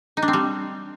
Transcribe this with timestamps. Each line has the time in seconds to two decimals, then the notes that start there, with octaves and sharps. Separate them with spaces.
0.17 D#4
0.22 D4
0.28 C4
0.33 G3